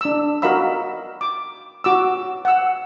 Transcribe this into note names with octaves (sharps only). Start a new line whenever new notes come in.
D4 E6
F#4 A#4 D#5 F5 B5 E6
D6
F#4 D6 E6
F#5 E6